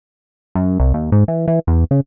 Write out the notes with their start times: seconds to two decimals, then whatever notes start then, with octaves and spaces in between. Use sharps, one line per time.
0.55 F#2
0.80 C2
0.94 D#2
1.12 G#2
1.28 E3
1.48 E3
1.67 E2
1.91 C#3